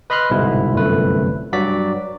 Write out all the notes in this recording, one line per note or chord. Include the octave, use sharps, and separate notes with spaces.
B4 D#5 B5 C6 F6 F#6
G1 C2 G#2 B2 E4
G1 C2 F#2 A3 B4
G2 F#3 F#4 D5 B6